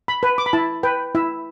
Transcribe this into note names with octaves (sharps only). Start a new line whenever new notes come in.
B5
B4
D6
B5
E4 A5
B4 G5
E4 E5